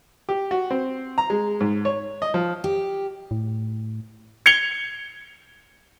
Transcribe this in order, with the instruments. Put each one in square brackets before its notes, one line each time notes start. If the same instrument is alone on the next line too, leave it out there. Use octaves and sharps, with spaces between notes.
[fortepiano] G4
F#4
C4
A#5
G#3
G#2
C#5
D#5
F3
[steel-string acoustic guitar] G4
[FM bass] A2
[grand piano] G#6 C#7 F7 G7